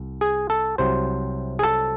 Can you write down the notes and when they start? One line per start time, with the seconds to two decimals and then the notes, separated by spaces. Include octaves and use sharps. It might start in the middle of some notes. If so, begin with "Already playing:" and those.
Already playing: C2
0.21 G#4
0.50 A4
0.78 C2 C3 F#3 C5
1.59 G#4
1.63 A4